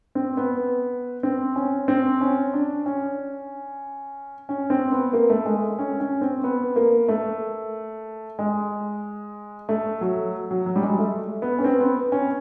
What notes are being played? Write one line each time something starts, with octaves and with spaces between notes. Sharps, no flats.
C4
B3
C4
C#4
C4
C#4
D4
C#4
C#4
C4
B3
A#3
A3
G#3
C#4
C#4
C4
B3
A#3
A3
G#3
A3
F#3
F#3
F#3
G3
G#3
A3
B3
C#4
C4
B3
C#4